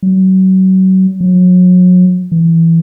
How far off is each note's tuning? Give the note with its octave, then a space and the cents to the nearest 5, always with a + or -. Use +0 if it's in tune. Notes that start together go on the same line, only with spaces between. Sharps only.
F#3 +30
F#3 -35
E3 +5